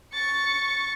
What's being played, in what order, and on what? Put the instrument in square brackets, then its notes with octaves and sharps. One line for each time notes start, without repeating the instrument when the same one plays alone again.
[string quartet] C#6 [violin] A6